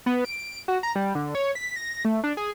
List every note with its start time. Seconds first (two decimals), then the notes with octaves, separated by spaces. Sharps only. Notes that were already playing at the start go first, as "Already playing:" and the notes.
0.06 B3
0.25 D7
0.68 F#4
0.83 A#5
0.95 G3
1.15 D3
1.35 C#5
1.55 B6
1.76 A#6
2.05 A3
2.24 D4
2.37 G#4